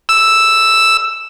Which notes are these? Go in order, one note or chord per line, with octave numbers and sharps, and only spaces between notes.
E6